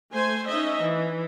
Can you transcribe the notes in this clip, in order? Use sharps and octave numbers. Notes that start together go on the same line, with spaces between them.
A3 C5 G#5
C#4 D#4 D#5 E5
E3